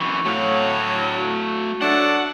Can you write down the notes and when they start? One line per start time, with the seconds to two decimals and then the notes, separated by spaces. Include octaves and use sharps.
0.01 F#2 E3 C#6
0.26 A2 F#3 A3 F5
1.18 F#4
1.81 F#3 A3 D4 F#5